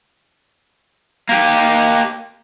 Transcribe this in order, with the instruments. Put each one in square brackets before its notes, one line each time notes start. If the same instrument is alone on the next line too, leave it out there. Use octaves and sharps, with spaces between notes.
[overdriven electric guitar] A#3 G4